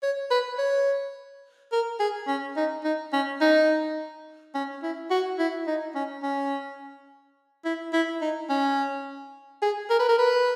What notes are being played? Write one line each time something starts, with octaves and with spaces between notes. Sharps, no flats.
C#5
B4
C#5
A#4
G#4
C#4
D#4
D#4
C#4
D#4
C#4
E4
F#4
E4
D#4
C#4
C#4
E4
E4
D#4
C#4
G#4
A#4
B4
A#4
B4